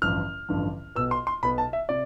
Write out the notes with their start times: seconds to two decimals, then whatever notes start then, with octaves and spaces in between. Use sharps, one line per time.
0.02 A1 G2 D3 F3 F6
0.49 A1 G2 D3 F3
0.96 B1 B2 B3 E6
1.11 C6
1.27 C6
1.43 B1 B2 B3 B5
1.58 A5
1.73 E5
1.89 C3 D5